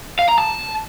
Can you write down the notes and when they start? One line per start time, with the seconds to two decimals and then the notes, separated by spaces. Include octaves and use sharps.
0.19 F5
0.29 A#5
0.38 A5